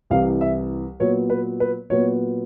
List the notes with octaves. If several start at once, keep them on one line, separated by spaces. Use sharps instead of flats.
C2 C3 E3 F5
E5
A#2 F#3 B3 C#5
B4
B4
A#2 F#3 B3 C#5